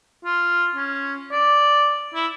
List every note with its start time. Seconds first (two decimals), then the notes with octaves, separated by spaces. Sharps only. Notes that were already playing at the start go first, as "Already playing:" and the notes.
0.25 F4
0.75 C#4
1.32 D5
2.14 E4